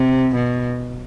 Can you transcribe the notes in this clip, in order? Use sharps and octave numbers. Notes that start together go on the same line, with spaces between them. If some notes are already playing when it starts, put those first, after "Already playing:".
Already playing: C3
B2